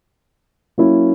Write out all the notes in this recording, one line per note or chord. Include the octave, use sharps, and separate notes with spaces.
F#3 A#3 C#4 E4